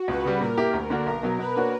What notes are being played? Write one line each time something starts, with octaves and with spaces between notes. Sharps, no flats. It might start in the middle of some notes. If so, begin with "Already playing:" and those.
Already playing: F#4
C#2 B4
C#3 G3
A#2 A#4
A#3 E4 G4
D2
D3 A#3 D4 F#4
B1 A#4
B2 F#3
B2 B4
A#3 D4 F#4 C#5